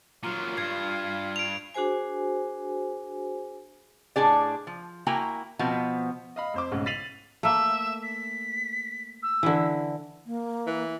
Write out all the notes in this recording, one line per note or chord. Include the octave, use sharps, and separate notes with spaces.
A#2 F#3 F4
G2 G#6 C7
D7 F7
D4 F#4 G#4 C5 G#5
A2 D4 G#4 D5
F3
A#3 E4 F#4 G5 G#5 A#5
B2 F3 B3 C4
D#5 F5 B5
F2 C5 D6
B1 G#2 C#3
A6 B6 C7 D#7 F7 F#7
A3 A#3 E5
B6
E6
D3 E3
A#3
E3